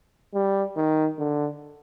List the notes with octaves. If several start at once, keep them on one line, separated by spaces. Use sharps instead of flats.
G3
D#3
D3